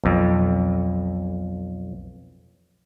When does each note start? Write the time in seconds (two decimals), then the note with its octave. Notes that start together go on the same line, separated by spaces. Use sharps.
0.04 B1 F2